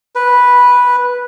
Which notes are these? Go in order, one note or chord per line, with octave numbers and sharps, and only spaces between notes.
B4